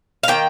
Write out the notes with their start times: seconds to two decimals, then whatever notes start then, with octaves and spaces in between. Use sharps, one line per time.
0.23 F5
0.28 D#3 A#3 G5